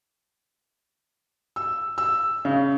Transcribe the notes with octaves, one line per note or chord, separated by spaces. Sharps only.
E6
E6
C#3